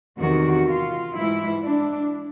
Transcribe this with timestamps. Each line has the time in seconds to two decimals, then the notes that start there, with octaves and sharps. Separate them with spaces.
0.19 E2 C3 D#3 F#4
0.66 F4
1.14 G#2 E3 E4
1.62 D4